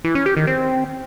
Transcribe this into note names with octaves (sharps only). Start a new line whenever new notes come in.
E3
C#4
G4
D#3
C4